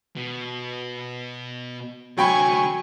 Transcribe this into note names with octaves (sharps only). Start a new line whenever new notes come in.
B2
D2 C3 F#3 G5 G#5 B5 C#6